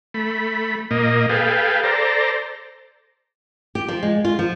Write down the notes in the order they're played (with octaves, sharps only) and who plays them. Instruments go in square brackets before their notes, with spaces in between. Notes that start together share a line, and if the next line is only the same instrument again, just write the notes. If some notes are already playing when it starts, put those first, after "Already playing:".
[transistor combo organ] A3 B5
A#2 A#3 D#5
G#4 A4 B4 F5 G5
A4 C5 D5 A#5
[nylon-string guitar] G4
F3
G#3
F4
F3